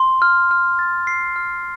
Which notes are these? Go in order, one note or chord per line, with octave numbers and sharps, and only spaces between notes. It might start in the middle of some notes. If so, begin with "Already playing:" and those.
Already playing: C6
F6
F6
A6
C7
F6